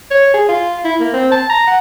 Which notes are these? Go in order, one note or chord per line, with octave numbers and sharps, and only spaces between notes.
C#5
G#4
F4
E4
A#3
C4
A5
A#5
F#5